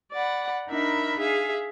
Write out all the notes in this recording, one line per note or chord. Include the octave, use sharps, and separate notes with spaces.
D5 F#5 B5
D4 D#4 A#4 E5 B5
G#4 E5 F5